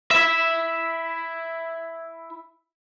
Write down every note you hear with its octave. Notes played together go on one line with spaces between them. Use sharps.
E4 E5